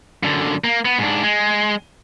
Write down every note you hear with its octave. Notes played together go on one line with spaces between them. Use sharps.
F#2 D3
A#3
B3
G#2 D4
G#3